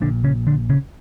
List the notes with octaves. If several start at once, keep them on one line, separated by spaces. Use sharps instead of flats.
A#1 A#2 D3 D4
C#3 C#4
D3 D4
C#3 C#4